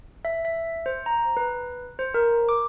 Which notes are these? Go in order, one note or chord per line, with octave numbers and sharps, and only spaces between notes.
E5
E5
C5
A#5
B4
C5
A#4
D6